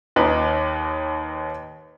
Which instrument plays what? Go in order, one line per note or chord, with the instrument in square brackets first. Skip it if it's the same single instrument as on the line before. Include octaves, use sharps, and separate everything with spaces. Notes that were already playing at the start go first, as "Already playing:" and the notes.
[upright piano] D#2 D#4 B4